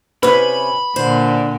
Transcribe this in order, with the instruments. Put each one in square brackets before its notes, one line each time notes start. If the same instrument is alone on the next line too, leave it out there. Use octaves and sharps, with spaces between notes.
[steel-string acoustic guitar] C3 C#4 [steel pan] B4 [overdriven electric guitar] B5
[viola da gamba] A#2 D3 [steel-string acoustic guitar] C5